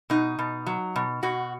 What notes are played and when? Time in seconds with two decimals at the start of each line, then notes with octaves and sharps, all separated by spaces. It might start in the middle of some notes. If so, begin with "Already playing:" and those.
0.10 B2 D#4
0.39 B2
0.67 F#3
0.96 B2
1.23 B2 F#4